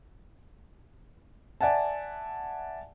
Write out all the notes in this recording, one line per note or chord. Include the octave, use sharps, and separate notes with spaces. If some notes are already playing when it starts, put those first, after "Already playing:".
D5 E5 F#5 G#5 A5